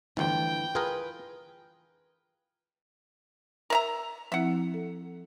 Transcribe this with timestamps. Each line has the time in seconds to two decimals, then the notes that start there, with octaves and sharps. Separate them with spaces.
0.17 G1 D2 E3 F3 G5
0.75 F4 G#4 A#4 B4
3.70 A#4 E5 A#5
4.32 F3 C4 E4 E5 F#5
4.74 A4